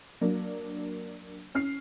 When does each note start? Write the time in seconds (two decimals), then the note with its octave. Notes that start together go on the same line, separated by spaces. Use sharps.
0.21 F#3 A#3 D4
1.55 C#4 F6 C7